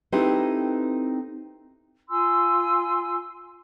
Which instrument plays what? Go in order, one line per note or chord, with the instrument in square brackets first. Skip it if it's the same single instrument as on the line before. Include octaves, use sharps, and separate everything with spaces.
[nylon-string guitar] C4 D#4 E4 G4 A4 B4
[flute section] F4 G#5 C6 E6